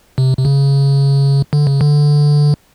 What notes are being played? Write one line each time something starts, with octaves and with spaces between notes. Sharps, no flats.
C3
C3
C#3
D3
C#3
D3